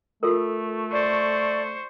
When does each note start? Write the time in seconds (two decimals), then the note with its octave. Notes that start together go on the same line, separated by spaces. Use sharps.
0.23 A3 F4 A4 A#4
0.92 C5 D5 C#6